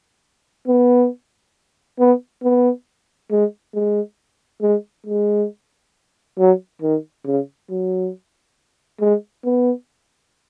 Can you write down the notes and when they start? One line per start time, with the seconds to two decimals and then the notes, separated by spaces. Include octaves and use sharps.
0.67 B3
1.99 B3
2.43 B3
3.31 G#3
3.74 G#3
4.62 G#3
5.06 G#3
6.38 F#3
6.82 D#3
7.26 C#3
7.70 F#3
9.00 G#3
9.45 B3